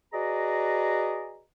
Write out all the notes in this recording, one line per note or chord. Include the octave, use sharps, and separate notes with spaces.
F#4 G#4 B4 D5 D#5 A#5